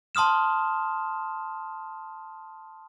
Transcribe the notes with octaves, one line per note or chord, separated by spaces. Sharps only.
A5 C6 D#6 F6 E7